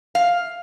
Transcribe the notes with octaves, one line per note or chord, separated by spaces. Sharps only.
F5